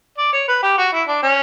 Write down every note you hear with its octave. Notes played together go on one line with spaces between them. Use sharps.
D5
C#5
B4
G4
F#4
E4
D4
C#4